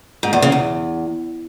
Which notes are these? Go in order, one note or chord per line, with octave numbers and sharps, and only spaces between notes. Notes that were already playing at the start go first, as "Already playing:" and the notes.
G#2
E2
C#3
E2